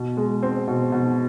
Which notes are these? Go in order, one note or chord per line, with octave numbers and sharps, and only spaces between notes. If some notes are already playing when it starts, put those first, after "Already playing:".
Already playing: B2
G#3
C4
B2
B2